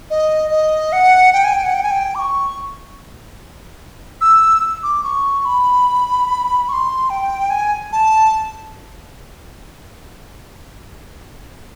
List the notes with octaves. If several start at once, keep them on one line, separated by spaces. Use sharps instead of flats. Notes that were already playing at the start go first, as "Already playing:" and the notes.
D#5
D#5
F#5
G5
G#5
G5
F#5
G5
G#5
G5
D6
C#6
E6
D6
C#6
B5
C#6
C6
G5
G#5
A5